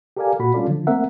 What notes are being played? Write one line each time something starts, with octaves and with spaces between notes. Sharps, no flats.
G4 A4 A#4 D5 F5 G#5
A#2 F#4 B5
G3 C#4 F4 A4 D5
D3 F3
A3 A#3 C4 A#4 E5 F#5